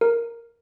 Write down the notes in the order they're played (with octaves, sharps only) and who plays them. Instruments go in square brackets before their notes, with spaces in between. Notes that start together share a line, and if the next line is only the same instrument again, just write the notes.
[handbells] A#4